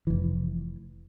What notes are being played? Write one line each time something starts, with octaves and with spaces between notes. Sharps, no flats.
F1 E3